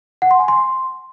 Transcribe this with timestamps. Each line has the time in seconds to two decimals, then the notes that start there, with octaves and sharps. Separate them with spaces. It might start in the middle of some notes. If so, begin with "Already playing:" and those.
0.22 F#5
0.31 C6
0.39 G#5
0.48 C6